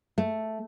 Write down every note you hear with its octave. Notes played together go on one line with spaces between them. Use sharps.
A3